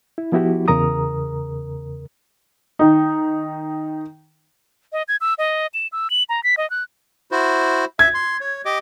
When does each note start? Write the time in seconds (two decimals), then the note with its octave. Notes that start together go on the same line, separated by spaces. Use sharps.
0.18 E4
0.32 F3 B3 E4 F#4 G4
0.68 E2 C#3 A#4 A#5 D#6
2.79 D#3 D#4
4.93 D#5
5.08 G#6
5.21 E6
5.38 D#5
5.74 E7
5.92 E6
6.10 F#7
6.29 A#5
6.44 B6
6.57 D#5
6.70 F#6
7.31 E4 F#4 C5
7.99 E5 G#6
8.14 C6
8.41 C#5
8.65 G4 D#5 D6